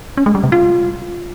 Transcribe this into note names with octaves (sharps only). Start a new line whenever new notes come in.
C#4
G#3
G3
C3
F4